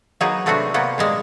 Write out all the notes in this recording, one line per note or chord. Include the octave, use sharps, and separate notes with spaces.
F#3 A#3 B3 D#4 G#4
C3 A3 B3 C4 D4 F#4
C3 A#3 B3
A#2 G3 G#3